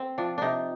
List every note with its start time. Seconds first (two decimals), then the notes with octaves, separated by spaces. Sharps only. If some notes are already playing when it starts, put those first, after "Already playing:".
Already playing: C4
0.18 F3 D4
0.38 C3 D4 D#4